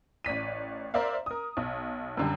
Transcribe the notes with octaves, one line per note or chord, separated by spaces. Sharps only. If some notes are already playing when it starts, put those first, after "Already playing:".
A1 D5 B6 D#7
A#4 C5 D5 E5 F5
A#4 D#6
B1
F#2 D3 G3